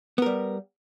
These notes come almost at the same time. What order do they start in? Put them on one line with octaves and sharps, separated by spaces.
B3 A#4 G3